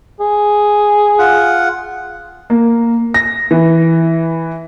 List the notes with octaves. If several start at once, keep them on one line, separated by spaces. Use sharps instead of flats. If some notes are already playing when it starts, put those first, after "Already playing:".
G#4
F4 F#5
A#3
A#6
E3